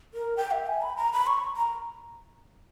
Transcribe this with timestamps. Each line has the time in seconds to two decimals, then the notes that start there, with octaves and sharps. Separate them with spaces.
0.14 A#4
0.37 G5
0.51 E5
0.66 G#5
0.82 B5
0.97 A#5
1.13 B5
1.27 C#6
1.57 A#5